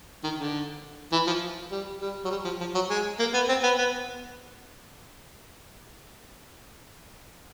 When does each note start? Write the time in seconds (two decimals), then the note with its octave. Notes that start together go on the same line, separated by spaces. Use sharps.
0.24 D#3
0.39 D3
1.12 E3
1.27 F3
1.71 G3
2.01 G3
2.25 F#3
2.30 G3
2.45 F3
2.61 F3
2.74 F#3
2.90 G#3
3.19 A#3
3.34 B3
3.49 C4
3.63 B3
3.78 B3